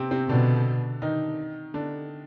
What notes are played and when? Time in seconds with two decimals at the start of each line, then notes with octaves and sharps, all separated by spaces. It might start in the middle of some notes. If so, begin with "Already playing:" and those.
Already playing: C3 C4
0.11 C3 C4
0.29 B2 D3 D4
1.02 D#3 D#4
1.74 D3 D4